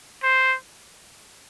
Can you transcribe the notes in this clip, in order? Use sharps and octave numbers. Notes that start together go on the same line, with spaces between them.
C5